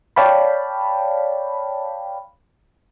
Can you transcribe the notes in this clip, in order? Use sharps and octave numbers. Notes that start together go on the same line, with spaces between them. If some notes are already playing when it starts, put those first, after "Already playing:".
C#5 D5 F5 G5 A5 B5